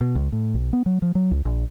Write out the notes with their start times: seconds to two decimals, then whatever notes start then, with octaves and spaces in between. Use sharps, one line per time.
0.01 B2
0.15 C#2
0.32 A2
0.54 B1
0.73 B3
0.86 F#3
1.02 F3
1.15 F#3
1.31 C#2
1.45 A#1